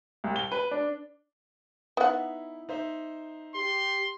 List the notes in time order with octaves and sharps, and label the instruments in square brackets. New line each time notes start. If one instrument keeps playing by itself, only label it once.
[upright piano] C2
G7
B4
D4
[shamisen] B3 F#5 [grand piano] D#4 E4
[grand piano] D#4 C5 E5
[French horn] G4 [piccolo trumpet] C6